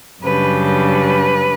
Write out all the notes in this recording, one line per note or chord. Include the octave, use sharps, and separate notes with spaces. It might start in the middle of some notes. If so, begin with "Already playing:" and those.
F#2 C#3 G3 D4 B4
B4